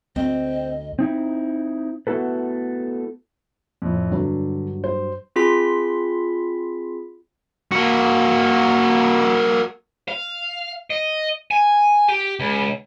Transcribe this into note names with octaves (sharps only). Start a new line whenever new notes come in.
D2 C4 D#5
C4 D#4 E4
A3 B3 E4 F#4 A4 B4
F2 A2
G2 D3 F#3
C5
C4 F4 G#4 B5 C6 B6
A#3 F#4
F5
D#5
G#5
G4
C#2